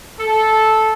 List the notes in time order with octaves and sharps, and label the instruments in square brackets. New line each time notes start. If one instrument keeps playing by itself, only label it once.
[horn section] A4